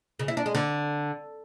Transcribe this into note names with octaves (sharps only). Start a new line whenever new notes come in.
C#3
E4
D4
G#3
D3